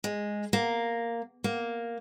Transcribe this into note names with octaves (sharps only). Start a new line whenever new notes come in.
G#3
A#3
A#3